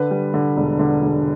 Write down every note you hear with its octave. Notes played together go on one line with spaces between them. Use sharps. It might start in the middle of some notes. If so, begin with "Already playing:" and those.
Already playing: D3 B4
G3
D3
E1
D3
E1